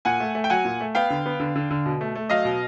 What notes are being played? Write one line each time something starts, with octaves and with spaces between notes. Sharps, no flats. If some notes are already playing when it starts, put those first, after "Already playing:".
A#2 F#5 G#5
A3
A3
G5
F#3 F#5 G#5
A#2
A3
B3 F5 G5
D3
B3
D3
D3
D3
B2
A3
A3
F#3 D#5 F5
B2